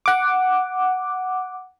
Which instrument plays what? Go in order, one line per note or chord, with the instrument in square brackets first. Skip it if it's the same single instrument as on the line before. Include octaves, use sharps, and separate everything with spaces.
[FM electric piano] F#5 D6